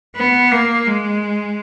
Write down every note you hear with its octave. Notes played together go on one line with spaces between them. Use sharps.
B3
A#3
G#3